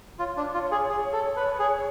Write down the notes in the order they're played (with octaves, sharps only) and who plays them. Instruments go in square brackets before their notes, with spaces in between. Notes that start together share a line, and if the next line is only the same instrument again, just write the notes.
[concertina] F4 [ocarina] C#5
[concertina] D4
F4
G#4
G#4
A4
B4
G#4